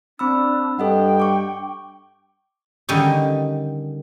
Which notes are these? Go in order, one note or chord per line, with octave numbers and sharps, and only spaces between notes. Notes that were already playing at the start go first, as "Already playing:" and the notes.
C4 D4 B5 E6
G2 A4 D#5 F#5 G5
C#6 D6
D3 D#3 G3 C#4 D#4 G4